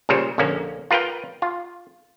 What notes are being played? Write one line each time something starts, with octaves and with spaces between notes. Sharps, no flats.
A#2 C#3 G3 C5 C#5
A#1 D3 A#3 C#4
F4 A#4 B4 F5 G5
F4